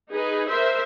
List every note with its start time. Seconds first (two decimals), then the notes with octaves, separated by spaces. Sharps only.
0.10 D#4 G#4 B4
0.49 A#4 C5 E5